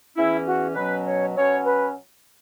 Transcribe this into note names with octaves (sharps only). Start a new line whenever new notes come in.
E2 E3 C#4 E4
F#4
B2 F#3 C#4 B4
C#5
B2 F#3 C#4 C#5
B4